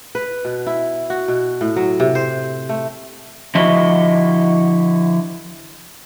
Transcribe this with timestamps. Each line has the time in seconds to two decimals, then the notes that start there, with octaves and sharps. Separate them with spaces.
0.15 B4
0.45 B2
0.67 E4
1.10 F#4
1.28 B2
1.61 A2
1.76 F#3
2.00 C3
2.15 C5
2.69 A3
3.55 D3 F3 E4 F#4 D#5